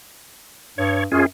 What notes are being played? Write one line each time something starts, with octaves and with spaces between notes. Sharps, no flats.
G2 C#5
F#2 C#4 F4 G#4